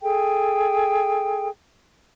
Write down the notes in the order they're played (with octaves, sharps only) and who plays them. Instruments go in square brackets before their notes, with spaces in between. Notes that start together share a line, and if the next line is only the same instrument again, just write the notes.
[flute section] G#4 A4 G5